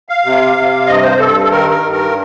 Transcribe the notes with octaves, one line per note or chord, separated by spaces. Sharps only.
F5
C3
C3
G2 D#5
C5
G2 A4
A4
D#3 A#4
A#4
G2
A#4